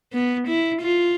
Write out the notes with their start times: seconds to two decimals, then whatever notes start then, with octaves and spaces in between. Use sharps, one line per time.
0.13 B3
0.48 E4
0.82 F4